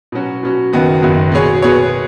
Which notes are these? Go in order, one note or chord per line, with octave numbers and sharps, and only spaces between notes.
B2 F#3 C#4 F#4
B2 F#3 C#4 F#4
F#1 F#2 D#3 B3 F#4
F#1 F#2 D#3 B3 F#4
B2 B3 G#4 C#5
B2 B3 G#4 C#5